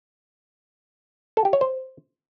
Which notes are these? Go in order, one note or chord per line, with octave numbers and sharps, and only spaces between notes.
A4
G4
C#5
C5